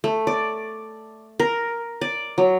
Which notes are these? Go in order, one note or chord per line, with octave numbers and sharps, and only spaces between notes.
A3
D5
A#4
D5
F#3